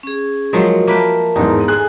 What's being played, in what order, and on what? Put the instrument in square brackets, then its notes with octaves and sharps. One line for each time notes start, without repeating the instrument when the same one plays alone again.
[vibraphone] C#4 G#4
[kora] F3 F#3 G#3 [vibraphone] A#4
[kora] A#3 B4 G5 [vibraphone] A#4 E5 A5
[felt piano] E2 G#2 [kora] D#4
[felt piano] G#4 F#6 [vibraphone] A4 G#5